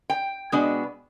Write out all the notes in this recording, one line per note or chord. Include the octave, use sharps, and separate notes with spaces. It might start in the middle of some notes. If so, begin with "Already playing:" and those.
G5
B2 G#3 B3 D4